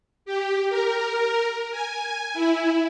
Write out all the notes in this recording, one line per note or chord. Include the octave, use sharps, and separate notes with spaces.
G4
A#4
G#5
E4